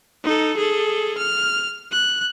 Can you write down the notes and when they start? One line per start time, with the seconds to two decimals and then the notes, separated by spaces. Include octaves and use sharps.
0.24 D#4 A4
0.57 G#4 A4
1.18 F6
1.91 F#6